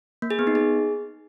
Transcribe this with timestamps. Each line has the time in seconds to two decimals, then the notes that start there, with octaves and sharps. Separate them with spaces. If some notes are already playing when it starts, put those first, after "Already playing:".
0.22 A#3
0.31 G#4
0.39 B3
0.47 D#4
0.55 G#4